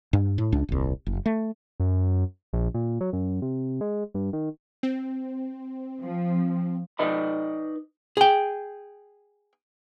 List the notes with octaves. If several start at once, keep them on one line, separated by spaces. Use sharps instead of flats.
G2
A2
C#2 D4
D#1 C2
F#1
A3
F#2
A#1
A#2
F#3
F#2
C3
G#3
G2
D#3
C4
F3
D#4 B4 D5 D#5 B5
G#4 G5